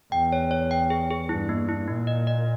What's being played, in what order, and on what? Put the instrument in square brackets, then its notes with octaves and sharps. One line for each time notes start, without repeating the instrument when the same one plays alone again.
[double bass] E2 [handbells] G5
[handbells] C#5
C#5
G5
G#4
G#4
[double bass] G2 [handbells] E4
[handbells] A#3
E4
[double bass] A#2 [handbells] A#3
[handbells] D#5
D#5